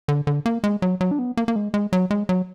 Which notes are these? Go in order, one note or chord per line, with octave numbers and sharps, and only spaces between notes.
D3
D3
A#3
G#3
F#3
F#3
D4
B3
A#3
A#3
G#3
G#3
F#3
G#3
F#3